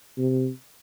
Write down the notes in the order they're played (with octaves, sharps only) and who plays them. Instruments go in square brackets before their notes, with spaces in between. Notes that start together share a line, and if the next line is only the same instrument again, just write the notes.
[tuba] C3